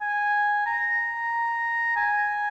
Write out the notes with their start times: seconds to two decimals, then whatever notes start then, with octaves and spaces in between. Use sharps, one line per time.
0.01 G#5
0.66 A#5
1.96 G#5